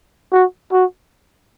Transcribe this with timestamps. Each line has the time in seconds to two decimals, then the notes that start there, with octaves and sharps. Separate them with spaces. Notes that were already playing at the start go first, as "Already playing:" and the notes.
0.32 F#4
0.72 F#4